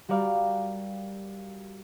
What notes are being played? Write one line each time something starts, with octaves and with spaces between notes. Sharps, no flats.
G3 F#4 G4 A#4 D5 F5